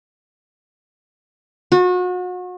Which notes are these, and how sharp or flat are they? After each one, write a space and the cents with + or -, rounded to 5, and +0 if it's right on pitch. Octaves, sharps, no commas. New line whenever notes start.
F#4 -35